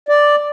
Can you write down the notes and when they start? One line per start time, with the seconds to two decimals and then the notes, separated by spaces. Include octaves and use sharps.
0.08 D5